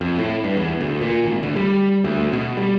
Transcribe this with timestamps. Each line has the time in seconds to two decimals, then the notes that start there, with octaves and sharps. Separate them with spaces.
0.01 F2
0.18 A2
0.44 G2
0.57 E2
0.81 D2
1.01 A#2
1.25 G#1
1.43 D2
1.56 G3
2.04 D2
2.33 B2
2.57 G3